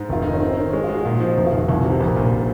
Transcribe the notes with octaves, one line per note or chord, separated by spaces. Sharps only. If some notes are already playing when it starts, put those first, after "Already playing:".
Already playing: G#2
F1 F4
D#3 D#4
C#4
D#3 C4
D#3 C#4
C#4
G#3 D#4
F4
G#3 F#4
A#2 F4
F3 D#4
F1 D#4
F4
F1
F#4
C2
C3 F#4
A#1
A#2